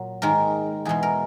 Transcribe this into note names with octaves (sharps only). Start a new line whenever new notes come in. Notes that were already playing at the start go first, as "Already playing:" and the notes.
Already playing: A#2 F#3
G#2 D#3 G#3 A#4
E2 B2 G#3 G#4
A#4